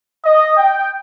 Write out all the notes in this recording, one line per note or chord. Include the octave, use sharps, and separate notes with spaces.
D#5
G5